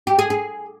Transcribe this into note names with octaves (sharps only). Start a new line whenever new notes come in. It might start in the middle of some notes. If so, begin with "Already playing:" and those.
G4
G#4
G#4